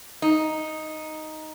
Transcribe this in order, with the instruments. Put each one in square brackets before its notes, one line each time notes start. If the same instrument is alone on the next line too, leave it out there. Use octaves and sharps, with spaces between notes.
[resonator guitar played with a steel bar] D#4